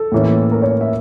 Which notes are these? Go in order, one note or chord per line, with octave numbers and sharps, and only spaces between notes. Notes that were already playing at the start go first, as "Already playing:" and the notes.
Already playing: A4
A2 E3 A#3 C#4
A#4
C#5
E5